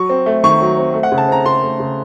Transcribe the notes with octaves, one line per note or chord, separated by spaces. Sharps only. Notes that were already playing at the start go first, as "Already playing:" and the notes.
Already playing: F#3 C#6
C4
A3
D#3 C#6
F#3
C4
A3
F#5
C#3
A5
C4 A#5
C#3 C6
A3
C#3